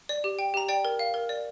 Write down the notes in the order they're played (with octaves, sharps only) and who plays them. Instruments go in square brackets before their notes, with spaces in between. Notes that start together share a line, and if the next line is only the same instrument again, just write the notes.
[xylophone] D5
G4
G5
G4 A#5
D5 G5
A#4
F5
A#4
D5